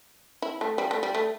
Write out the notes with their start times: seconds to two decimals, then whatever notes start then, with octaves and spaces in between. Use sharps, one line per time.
0.42 E4
0.61 A3
0.78 G3
0.91 A3
1.03 G3
1.15 A3